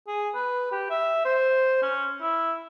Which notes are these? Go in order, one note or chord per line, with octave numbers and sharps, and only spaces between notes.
G#4
B4
G4
E5
C5
C#4
E4